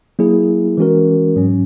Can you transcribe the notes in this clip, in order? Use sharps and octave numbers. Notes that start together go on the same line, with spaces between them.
F#3 A#3 E4 G#4
E3 G#3 C#4 F#4 A#4
G#2 F#3 C#4